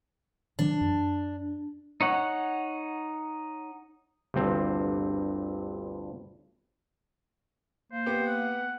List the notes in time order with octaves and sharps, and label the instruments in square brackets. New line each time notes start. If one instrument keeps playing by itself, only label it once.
[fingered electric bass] D#3 E3 F#3 [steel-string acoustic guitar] D4
[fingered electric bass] F#2
[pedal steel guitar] D#4 C#5 F#5
[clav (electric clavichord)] G1 D2 G2 C4
[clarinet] A#3 [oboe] C5
[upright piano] B3 G4
[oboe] F#5